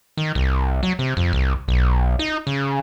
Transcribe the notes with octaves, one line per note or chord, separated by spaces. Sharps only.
D#3
C2
F#3
C3
F2
C2
B1
D#4
C#3